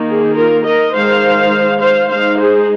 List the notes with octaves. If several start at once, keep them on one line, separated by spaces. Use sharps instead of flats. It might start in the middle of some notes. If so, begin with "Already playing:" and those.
Already playing: D#3 A#3 D#4
G#4
F4 A#4
A#4 D#5
D#3 G#3 D#4 C5 F5
C5 F5
G#3 D#4 C5 F5
G#4 C5